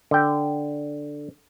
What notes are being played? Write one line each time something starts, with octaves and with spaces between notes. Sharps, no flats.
D3 G5